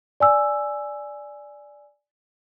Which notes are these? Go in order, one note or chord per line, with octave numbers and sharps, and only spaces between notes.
D5 G#5 E6